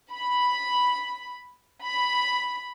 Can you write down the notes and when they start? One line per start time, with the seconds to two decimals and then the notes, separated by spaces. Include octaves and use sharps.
0.11 B5
1.83 B5